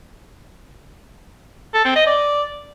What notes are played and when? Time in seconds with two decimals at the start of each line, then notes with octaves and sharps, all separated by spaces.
1.74 A4
1.85 C4
1.96 D#5
2.07 D5